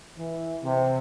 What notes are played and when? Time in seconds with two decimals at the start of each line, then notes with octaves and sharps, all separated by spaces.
0.18 E3
0.64 C3